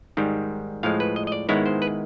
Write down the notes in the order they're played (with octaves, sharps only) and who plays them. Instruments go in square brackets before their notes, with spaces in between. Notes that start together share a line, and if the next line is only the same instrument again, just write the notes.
[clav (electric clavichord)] G#2 D#3 G3
A2 F3 G#3 F5
B4
D#5
D#5
D5
G#2 D#3 G#3 B3 E4 C#5
C5
B4